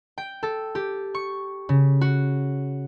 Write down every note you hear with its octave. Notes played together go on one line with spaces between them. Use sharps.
G5
A4
G4
C#6
C#3
F#4